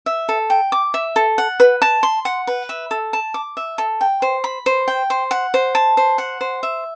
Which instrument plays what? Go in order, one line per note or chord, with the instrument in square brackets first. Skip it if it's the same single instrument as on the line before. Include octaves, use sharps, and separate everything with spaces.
[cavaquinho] E5
A4
G5
D6
E5
A4
F#5
B4
A5
C6
F#5
B4
E5
A4
A5
D6
E5
A4
G5
C5
B5
C5
G5
C5
F#5
C5
A5
C5
F#5
C5
E5